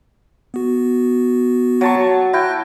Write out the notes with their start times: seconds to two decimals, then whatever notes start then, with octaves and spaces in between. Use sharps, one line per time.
0.54 B3 F#4
1.81 F#3 A5 C#6
2.33 E4 G5 F#6 A#6